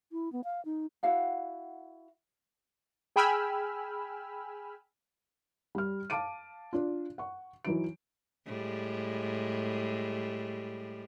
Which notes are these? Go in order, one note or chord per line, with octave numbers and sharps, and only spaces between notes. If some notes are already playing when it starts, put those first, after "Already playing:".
E4
B3
F5
D#4
E4 F#4 F5 F#5
G#4 G5 G#5 B5 E6 F6
G3 F6
F5 A5 D6 D7 D#7
D4 F4
F#5 C#6
E3 F#3 D#4 D7
A2 G3 G#3